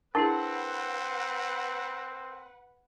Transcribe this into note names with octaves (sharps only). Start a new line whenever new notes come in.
C4 D4 E4 G#4 A#4 B4 F#5 A5